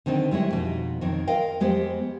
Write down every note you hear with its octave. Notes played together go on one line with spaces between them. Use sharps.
D3 D#3 B3 C4
G3 G#3 E4 C#5
F2 B2 D#4
F2 D#3 C4 C#5
A#4 D#5 F5 G5
F2 G#3 B3 G4 C5